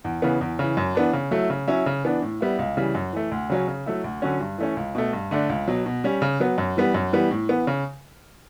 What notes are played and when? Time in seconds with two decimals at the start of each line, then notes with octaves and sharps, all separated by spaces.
0.04 E2
0.22 C#3 E3 B3
0.41 E2
0.59 C#3 E3
0.77 F#2
0.95 E3 B3 D4
1.13 C#3
1.31 F#3 A3 E4
1.50 C#3
1.67 F#3 C#4 E4
1.86 C#3
2.04 E3 B3 D4
2.22 A2
2.41 G3 B3 E4
2.59 C#2
2.77 C#3 E3 G3
2.95 F#2
3.13 E3 A3
3.31 D2
3.50 C#3 F#3 C#4
3.68 C#3
3.86 F#3 A3 E4
4.04 D2
4.22 D3 F#3 C#4
4.40 G2
4.58 E3 A3 C#4
4.77 C#2
4.95 B2 A3
5.13 G2
5.31 D3 A3 D4
5.49 C#2
5.68 B2 F#3
5.86 B2
6.04 G3 C#4
6.22 C#3
6.40 F#3 B3
6.58 F#2
6.77 E3 G3 B3
6.94 F#2
7.13 E3 G3 B3
7.31 A2
7.49 E3 B3
7.67 C#3